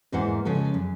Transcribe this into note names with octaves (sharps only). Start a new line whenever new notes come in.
E2 G#2 A#3 E4 C5 F#5
C#3 F3 G#3 A4
F#2